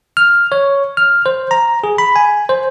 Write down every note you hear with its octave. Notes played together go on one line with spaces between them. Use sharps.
F6
C#5
F6
C5
A#5
G#4
B5
G#5
C5